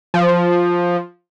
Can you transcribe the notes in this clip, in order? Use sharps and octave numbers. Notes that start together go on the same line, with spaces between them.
F3